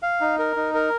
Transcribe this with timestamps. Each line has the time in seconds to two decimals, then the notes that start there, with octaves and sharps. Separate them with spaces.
0.02 F5
0.21 D#4
0.39 A#4
0.56 D#4
0.74 A#4